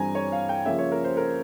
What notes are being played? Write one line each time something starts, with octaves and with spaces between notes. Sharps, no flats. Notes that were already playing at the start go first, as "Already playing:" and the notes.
Already playing: G2 E3 G3 C4 G#5 A#5
C#5
F5
G5
C#3 F3 A#3 C#4 E5
C#5
A#4
C5
A#4